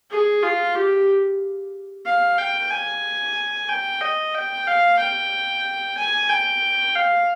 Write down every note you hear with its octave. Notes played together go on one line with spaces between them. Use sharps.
G#4
F4
G4
F5
G5
G#5
G5
D#5
G5
F5
G5
G#5
G5
F5